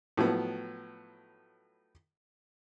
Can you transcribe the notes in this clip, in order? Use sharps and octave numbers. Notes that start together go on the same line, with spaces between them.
A2 F3 F#3 B3